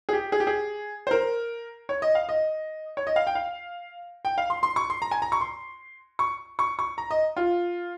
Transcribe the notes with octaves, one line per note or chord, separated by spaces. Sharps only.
G#4
G4
G#4
G4
G#4
C5
A#4
C#5
D#5
F5
D#5
C#5
D#5
F5
G5
F5
G5
F5
C6
C6
C#6
C6
A#5
G#5
A#5
C#6
C6
C#6
C#6
C#6
A#5
D#5
F4